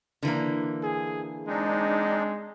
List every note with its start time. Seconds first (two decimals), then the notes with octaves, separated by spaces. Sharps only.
0.23 D3 E3 A#3
0.83 G#4
1.48 G#3 C4 D4 D#4